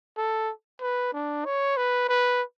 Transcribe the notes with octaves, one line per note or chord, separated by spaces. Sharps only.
A4
B4
D4
C#5
B4
B4